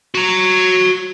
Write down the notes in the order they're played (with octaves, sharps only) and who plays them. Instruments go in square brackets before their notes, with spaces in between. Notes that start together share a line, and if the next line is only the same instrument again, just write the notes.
[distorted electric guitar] F#4 A#5